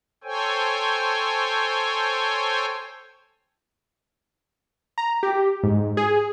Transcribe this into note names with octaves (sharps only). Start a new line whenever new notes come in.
A4 C5 C#5 G5 G#5
A#5
G4
G#2
G#4